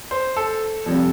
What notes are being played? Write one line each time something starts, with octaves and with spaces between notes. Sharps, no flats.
C5
A4
F2 C3 G3